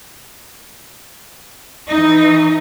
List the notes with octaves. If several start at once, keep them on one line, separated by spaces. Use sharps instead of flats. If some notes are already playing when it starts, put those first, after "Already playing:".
E3 D#4